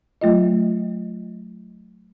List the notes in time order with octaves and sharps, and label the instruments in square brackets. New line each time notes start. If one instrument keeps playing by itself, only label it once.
[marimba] F#3 A3 F4 D#5